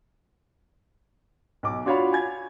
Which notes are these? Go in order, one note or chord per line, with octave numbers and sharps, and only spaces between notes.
B1 D6
D4 F4 F#4 C#5 F5 B5
G#5 G#6